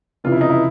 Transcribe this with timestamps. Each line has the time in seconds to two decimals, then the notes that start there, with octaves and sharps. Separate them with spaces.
0.24 F1 F2 C#3 E3 F4
0.32 E4
0.41 D#4
0.50 E4